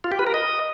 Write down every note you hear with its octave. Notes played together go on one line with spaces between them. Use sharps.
F4
G4
B4
A#4
D#5